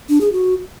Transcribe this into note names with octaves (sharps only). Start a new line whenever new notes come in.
D4
G#4
F#4